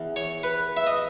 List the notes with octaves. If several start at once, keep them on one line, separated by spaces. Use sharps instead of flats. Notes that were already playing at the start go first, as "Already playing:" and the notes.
Already playing: E2
C#5
B4
E5
D#5